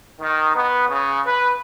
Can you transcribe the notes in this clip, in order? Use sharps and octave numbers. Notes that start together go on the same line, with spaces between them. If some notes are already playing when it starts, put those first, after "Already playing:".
D#3
B3
C#3
B4